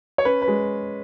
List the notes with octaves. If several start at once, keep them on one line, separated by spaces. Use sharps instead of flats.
C#5
C#4 B4
B4
G#3